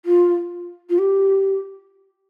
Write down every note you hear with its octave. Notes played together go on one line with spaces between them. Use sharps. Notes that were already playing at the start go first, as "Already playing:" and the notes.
F4
F4
G4